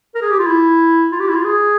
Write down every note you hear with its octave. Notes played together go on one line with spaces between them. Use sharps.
A#4
G#4
G4
F4
E4
F4
G4
E4
F4
G#4